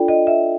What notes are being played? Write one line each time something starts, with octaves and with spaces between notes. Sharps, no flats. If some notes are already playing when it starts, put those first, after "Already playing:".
Already playing: D4 F4 A4 D5 G5
D#5
E5